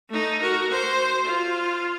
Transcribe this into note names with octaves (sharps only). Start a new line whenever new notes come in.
A3 D#4
F#4 A#4
C5
F4